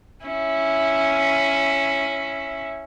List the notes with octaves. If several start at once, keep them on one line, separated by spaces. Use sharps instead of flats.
C#4 E4